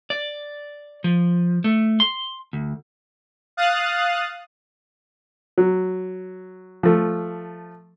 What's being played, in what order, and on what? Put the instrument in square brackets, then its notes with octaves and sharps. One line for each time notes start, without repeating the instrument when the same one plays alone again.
[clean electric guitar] D5
F3
A3
C6
D2
[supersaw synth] F5 D#6 F#6 A6
[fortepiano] F#3
F3 A3